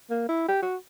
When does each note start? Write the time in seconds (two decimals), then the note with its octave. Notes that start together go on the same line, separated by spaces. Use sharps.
0.10 A#3
0.29 E4
0.48 G4
0.62 F#4